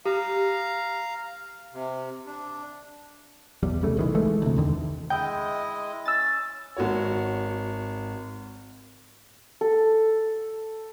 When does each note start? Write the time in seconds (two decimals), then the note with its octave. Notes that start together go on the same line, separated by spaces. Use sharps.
0.05 G4 F5 A#5
1.74 C3
2.27 D4
3.63 B1 E2 G3
3.81 C2 C#3 A3
3.97 C2 D#3 E3
4.15 E3 G#3 A3
4.42 D2 C3
4.57 E2 D3 D#3
5.10 G#3 E4 D#5 G5
6.06 C#4 E6 A6
6.77 G#1 F#4 C#5
9.61 A4